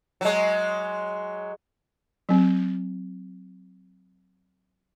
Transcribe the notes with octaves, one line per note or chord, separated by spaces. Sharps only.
F#3 G#3
F#3 C4